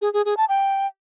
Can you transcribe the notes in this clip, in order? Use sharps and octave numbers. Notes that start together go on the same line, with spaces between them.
G#4
G#4
G#4
A5
G5